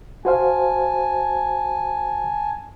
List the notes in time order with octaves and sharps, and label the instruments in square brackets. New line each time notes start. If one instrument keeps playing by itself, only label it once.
[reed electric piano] F#4 C5 F5 [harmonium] G#5 A5